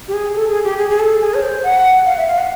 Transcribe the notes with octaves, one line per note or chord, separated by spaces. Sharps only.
G4
G#4
A4
G#4
G4
G#4
G#4
A4
G#4
C#5
C5
F#5
F5
E5
F5
F#5